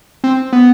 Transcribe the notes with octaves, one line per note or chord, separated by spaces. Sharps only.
C4
B3